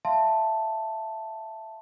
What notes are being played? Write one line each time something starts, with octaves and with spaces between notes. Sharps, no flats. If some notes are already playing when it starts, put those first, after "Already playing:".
E5 F5 A5 C6